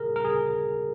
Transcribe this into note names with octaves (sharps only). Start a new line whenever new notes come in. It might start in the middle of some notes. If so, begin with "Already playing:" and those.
Already playing: G#4 A#4
A#4
G#4